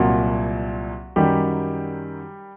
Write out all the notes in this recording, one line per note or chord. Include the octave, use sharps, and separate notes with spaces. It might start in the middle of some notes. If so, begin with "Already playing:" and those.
Already playing: C2 A#2 F#3 F#4
F#2 D#3 F#3 G3 G4